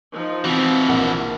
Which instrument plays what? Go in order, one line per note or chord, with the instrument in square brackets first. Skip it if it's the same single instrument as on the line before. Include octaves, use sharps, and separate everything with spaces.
[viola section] F3 D#4
[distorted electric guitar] B2 E3 [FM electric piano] C4 F#4
[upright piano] A#1 F#5 [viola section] A#3